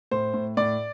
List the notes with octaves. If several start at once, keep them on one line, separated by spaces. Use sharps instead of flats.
A2 C5
A2
A2 D5